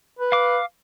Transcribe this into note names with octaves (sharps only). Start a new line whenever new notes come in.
B4
F5 D6